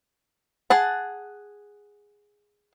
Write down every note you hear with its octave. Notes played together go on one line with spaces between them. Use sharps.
G#4 F#5 A5